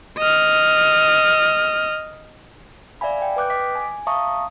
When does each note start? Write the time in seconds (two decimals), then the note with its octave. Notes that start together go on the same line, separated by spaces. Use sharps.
0.18 D#5 F6
3.01 D5 E5 F5 G#5 B5
3.22 G5
3.36 B4 G5 D6 F#6 G6
3.50 D#5 D6 B6
3.75 G#5
4.07 E5 F5 A5 A#5 C#6 D#6